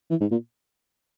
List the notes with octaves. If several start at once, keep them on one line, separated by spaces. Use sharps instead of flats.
E3
G#2
A#2